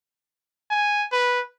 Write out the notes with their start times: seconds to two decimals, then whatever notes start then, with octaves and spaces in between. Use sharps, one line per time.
0.70 G#5
1.12 B4